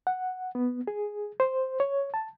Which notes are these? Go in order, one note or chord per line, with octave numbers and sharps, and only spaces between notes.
F#5
B3
G#4
C5
C#5
A5